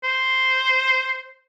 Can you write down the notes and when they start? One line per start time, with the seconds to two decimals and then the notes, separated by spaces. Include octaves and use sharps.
0.04 C5